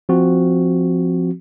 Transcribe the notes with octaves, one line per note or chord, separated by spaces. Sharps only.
F3 C4 F#4